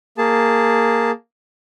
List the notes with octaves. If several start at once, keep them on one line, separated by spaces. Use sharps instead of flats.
A#3 G#4 A5